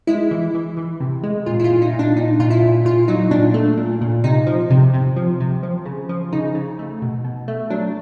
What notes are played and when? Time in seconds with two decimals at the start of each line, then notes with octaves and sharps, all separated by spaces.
0.07 G#3 E4
0.31 E3
0.55 E3
0.77 E3
1.01 C3
1.23 G#3
1.46 A#2 F4
1.60 E4
1.64 F4
1.70 A#2
1.82 D#4
1.93 A#2
1.99 D4
2.16 A#2 D#4
2.40 A#2 F4
2.50 E4
2.62 A#2
2.85 A#2 F4
3.08 F#3 D#4
3.31 A#2 D4
3.54 A3
3.77 A#2
4.01 A#2
4.24 C3 D#4
4.47 F3
4.70 C3
4.94 C3
5.16 F3
5.40 C3
5.63 F3
5.86 C#3
6.09 F3
6.33 C#3 D#4
6.55 C#3
6.79 A3
7.02 B2
7.24 B2
7.48 A3
7.70 F#3 D4